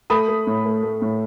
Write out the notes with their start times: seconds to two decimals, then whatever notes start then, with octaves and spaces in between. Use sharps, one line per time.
0.10 A3 B5 D#6
0.28 A3
0.47 A2
0.65 A3
0.83 A3
1.02 A2